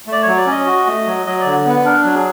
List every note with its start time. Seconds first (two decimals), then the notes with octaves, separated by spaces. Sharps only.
0.07 A3 D5
0.22 F#3 C#5
0.37 D5
0.47 C#4 D#5
0.66 F#4
0.87 A3
1.07 F#3
1.26 F#3 D#5
1.40 D3 D5
1.65 B3 B4
1.85 D4 A#4
2.04 F#3
2.15 G#4